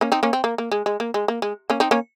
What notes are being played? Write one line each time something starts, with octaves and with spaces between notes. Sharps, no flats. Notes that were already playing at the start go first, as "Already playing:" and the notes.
A#3 C#4
C4 D#4
A#3 C#4
C4
A#3
A#3
G#3
G#3
A#3
G#3
A#3
G#3
A#3 C#4
C4 D#4
A#3 C#4